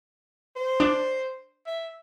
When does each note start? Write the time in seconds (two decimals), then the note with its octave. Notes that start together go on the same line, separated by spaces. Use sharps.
0.56 C5
0.80 D4
1.67 E5